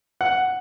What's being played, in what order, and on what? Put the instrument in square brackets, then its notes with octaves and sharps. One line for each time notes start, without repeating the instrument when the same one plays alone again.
[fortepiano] F#5